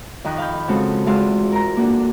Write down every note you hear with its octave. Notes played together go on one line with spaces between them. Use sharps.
F2 D#3 A#5 F#6
F5 B5 G6
C#3 F3 G#3 C4 F#4 A4
E2 G#3 F4 F#4 C6 E6
A#4 A#5
A#3 D4 F#4 A4